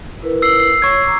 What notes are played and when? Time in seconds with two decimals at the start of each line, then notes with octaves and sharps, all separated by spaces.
0.23 E4 A#4 B4
0.42 E6 C7
0.60 C7
0.82 C#5 C#6 G#6
1.04 A#5 D6